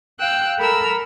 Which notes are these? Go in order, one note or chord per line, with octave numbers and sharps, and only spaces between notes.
F5 G5 E6 F#6
A4 A#4 A#5 B5 E6 F6